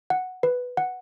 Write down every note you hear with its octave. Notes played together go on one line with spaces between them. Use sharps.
F#5
B4
F#5